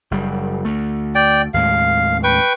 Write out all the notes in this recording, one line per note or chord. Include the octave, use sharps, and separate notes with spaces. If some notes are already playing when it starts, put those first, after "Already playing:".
F#1 G3
D2 A3
D5 G5
D#2 A2 G#3 F5
B4 G5 C#6